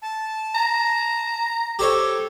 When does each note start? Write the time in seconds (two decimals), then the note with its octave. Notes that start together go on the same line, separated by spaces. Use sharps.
0.02 A5
0.55 A#5
1.79 G4 A4 C5 C#5